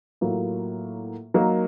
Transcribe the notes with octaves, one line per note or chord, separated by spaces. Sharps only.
A2 F#3 A#3 F4
F#3 A#3 D#4 A#4